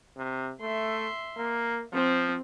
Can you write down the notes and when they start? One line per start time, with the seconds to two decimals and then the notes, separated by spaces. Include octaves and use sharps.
0.17 C3
0.61 A3 E5 C6
1.37 A#3
1.93 F3 C4